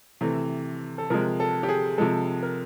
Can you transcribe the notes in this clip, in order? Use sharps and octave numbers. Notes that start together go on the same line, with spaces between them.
C3 E3 A3
A4
C3 F3 G#3 A#4
A4
G4
G#4
C3 F3 G#3 A4
A#4